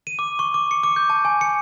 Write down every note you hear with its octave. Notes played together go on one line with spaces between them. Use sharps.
D#7
D6
C#6
D6
C#7
D6
G6
A5
G#5
C#7